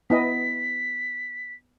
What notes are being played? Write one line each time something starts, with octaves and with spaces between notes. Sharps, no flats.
B3 E4 D#5 B6